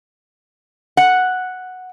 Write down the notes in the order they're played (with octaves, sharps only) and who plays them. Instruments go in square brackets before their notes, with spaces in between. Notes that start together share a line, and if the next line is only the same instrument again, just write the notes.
[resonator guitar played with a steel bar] F#5